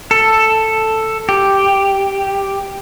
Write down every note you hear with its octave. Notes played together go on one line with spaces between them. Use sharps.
A4
G4